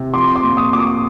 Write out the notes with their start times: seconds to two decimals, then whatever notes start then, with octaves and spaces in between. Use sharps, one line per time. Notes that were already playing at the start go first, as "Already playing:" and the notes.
Already playing: C3
0.14 F3 C6 D6
0.35 C6 D6
0.42 A#2
0.57 C#6 D#6
0.72 A#2 D6
0.79 C#6 D#6